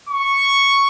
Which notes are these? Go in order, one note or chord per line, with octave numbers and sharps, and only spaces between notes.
C#6